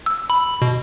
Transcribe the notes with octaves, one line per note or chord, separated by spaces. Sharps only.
E6
B5
B2